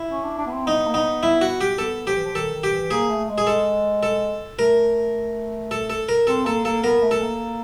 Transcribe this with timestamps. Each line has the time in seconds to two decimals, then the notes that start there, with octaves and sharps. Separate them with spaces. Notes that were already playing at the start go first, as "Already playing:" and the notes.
Already playing: E4
0.10 C#4
0.24 D4
0.38 D4
0.47 B3
0.53 C4
0.66 B3 D#4
0.87 A#3
0.94 B3 D#4
1.23 E4
1.41 F#4
1.61 G4
1.78 B3 A4
2.07 F3 G4
2.16 E3
2.24 F3
2.35 D#3 A4
2.54 D#3
2.64 G4
2.72 E3
2.91 A#3 G#4
3.10 A3
3.29 G#3
3.38 G#4
3.47 G#3 A4
4.03 A4
4.59 A3 A#4
5.71 A4
5.90 A4
6.09 A#4
6.27 C4 A4
6.46 A#3 A4
6.65 A#3 A4
6.83 B3 A#4
7.03 A3
7.11 A4
7.22 A#3